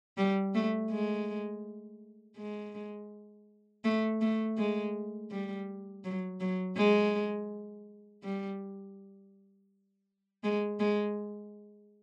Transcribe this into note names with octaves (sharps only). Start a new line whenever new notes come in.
G3
A3
G#3
G#3
A3
A3
G#3
G3
F#3
F#3
G#3
G3
G#3
G#3